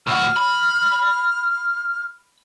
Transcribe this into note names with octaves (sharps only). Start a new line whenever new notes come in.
A2 F#4 F6
B5